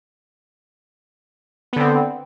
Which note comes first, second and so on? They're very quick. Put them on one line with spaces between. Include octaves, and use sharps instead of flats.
B3 D3 C4